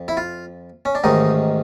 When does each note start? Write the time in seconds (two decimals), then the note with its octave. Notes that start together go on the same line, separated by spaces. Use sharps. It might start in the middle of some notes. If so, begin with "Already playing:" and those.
Already playing: F2
0.08 E4
0.17 F4
0.85 C#4
0.95 D4
1.04 A1 G#2 D#3 D#4